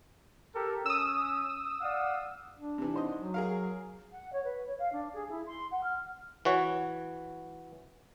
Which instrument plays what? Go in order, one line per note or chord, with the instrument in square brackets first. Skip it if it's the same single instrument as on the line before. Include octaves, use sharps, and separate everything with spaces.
[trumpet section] G4 A4 A#4
[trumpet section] C#4 [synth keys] D#6 E6
[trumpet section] D5 F5 F#5
[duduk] D4
[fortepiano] C3 E3
G#2 C5 D#5
[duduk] F#3
[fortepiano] G#4 A#4 F5
[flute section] F#5
C#5
B4
C#5
F5
D4
G#4
E4
C6
F#5
F6
[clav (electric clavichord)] E3 F#4 C#5